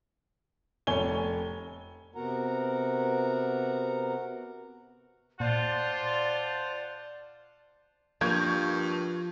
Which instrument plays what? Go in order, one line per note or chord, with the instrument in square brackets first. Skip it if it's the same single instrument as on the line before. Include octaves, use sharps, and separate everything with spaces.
[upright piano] F1 C#5 G#5 G7
[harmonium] C3 B3 F#4 A#4 F#5 A#5
[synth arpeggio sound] A#2 [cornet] F4 [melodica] C5 F#5 A5 [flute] D5
[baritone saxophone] G2 [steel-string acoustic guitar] F3 [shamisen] A#3 [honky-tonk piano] C#6 G6 G#6